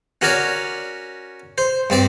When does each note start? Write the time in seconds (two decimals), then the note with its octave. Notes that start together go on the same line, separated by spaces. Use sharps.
0.22 C#4 F#4 A#4 C#5 D5
1.58 C5
1.90 G2 C4 D5